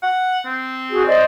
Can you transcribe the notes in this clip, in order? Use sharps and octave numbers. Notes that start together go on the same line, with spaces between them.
F#5
C4
F#4 G#4
C5 D5 D#5